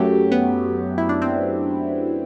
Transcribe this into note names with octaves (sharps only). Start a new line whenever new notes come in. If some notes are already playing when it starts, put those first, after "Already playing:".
Already playing: F#2 F#3 A3 G4
B3
E4
D4
C4